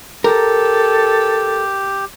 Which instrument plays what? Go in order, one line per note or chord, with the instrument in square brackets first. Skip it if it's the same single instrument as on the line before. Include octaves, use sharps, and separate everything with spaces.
[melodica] G4 [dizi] A4 [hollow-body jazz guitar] A#4